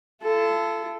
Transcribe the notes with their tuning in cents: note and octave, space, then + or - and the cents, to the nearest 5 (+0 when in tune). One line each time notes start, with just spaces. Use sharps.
F4 -45 A4 +0